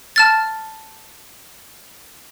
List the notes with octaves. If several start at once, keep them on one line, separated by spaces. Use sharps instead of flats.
A5 F6 A6